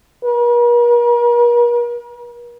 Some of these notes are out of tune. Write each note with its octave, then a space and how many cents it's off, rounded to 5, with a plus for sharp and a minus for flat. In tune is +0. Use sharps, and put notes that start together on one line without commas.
A#4 +45